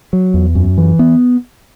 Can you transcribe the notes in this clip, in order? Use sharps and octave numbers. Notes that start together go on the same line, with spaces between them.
F#3
E2
F#2
E3
B3